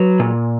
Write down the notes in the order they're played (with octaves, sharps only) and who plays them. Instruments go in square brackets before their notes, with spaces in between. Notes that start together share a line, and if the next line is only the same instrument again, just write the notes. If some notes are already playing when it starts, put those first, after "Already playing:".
Already playing: [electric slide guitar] F#3 B4
A#2